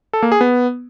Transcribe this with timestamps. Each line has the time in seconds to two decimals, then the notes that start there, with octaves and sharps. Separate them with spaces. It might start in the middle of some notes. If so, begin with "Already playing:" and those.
0.13 A4
0.23 A#3
0.32 G#4
0.41 B3